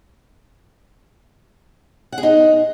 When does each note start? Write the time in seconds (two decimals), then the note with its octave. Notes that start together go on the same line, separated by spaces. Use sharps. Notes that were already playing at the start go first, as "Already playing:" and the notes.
2.12 F#5
2.18 G#4
2.23 D#4